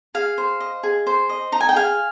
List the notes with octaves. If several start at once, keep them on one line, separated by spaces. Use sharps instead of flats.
G#4 F5
C5
D#5
G#4
C5
D#5
D#4 A#5
G#5
G5
G#4 F5 G#5